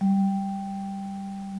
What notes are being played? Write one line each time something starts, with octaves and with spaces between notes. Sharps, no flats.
G3